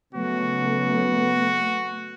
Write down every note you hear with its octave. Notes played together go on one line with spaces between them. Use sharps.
C#3 F#3 A3 B3 F#4